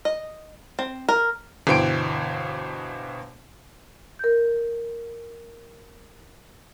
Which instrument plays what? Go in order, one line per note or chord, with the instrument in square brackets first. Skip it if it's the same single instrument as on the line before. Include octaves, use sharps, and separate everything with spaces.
[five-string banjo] D#5
C4
A#4
[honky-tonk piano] G1 B2 E3 C5 G5 D7
[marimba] A#4 G6